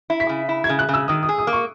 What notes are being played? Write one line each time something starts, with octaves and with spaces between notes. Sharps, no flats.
E4
B6
C#3
E4
G#6
C#3
F#6
C#3
E6
D#3 D#6
D#6
G#4
D#6
A#3
C#6